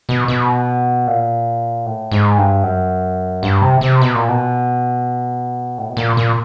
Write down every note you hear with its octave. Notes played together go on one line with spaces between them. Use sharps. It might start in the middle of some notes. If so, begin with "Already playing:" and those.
B2
B2
A#2
A2
G#2
G2
F#2
G2
C3
C3
B2
A#2
B2
A2
B2
A#2
A#2